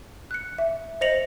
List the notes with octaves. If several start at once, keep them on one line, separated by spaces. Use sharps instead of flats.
F#6 C#7
E5
C5 D#5 A#6 C#7 F7 F#7